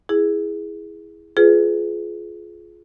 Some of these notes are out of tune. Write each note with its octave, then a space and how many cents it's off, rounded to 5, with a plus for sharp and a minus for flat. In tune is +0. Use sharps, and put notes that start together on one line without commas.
E4 +0 G#4 +0
F4 -5 G#4 +25 B4 +25